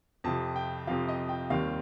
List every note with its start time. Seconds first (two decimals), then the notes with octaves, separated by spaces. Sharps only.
0.24 F2 C3 F3 A5
0.56 G5
0.87 F2 C3 F3 F5
1.08 D#5
1.29 G5
1.50 D#2 D#3 G3 C4 F5